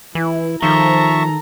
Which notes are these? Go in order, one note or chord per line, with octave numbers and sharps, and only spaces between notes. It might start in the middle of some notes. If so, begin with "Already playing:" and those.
E3 E4
D#3 F3 A4 E5 A5 A#5 C#6